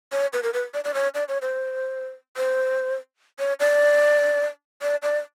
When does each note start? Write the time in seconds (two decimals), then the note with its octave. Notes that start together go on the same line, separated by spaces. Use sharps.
0.12 C#5
0.33 B4
0.43 A#4
0.54 B4
0.74 D5
0.84 D5
0.94 C#5
1.15 D5
1.28 C#5
1.42 C5
2.37 C5
3.39 C#5
3.60 D5
4.82 D5
5.03 D5